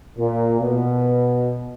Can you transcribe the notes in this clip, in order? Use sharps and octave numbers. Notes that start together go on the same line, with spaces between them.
A#2
B2